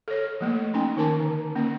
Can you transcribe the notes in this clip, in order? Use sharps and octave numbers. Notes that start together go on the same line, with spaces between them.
A4 C#5
F3 A3 A#3
C#4 D#4 G5 G#5
D#3 D#4 A#4 G#5 A5 D6
D3
A#3 C#4